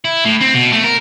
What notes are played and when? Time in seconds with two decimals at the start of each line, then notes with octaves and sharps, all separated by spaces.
0.05 E4
0.25 A2
0.41 C4
0.54 B2
0.73 A3
0.84 A#4